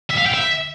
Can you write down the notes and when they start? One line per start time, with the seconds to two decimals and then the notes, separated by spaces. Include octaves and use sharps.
0.10 E5
0.18 F5
0.26 G5
0.34 E5